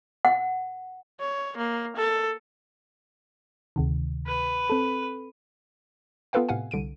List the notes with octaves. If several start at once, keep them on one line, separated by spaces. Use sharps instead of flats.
F#5
C#5
A#3
A4
D2 C3 D#3
B4
C4 A4
B3 F4 A4 B4 F5 G5
A2 C3 F5 F#5 G#5
C2 D3 D7 D#7